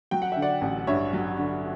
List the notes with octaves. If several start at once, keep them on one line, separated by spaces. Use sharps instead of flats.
F#3 G5
F#5
D3 E5
D5 F#5
A1
G2 C#5 E5
F#3
D3